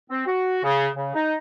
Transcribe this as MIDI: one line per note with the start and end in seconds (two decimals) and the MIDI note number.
0.10 0.23 60
0.26 0.58 66
0.63 0.87 49
0.95 1.13 49
1.15 1.35 63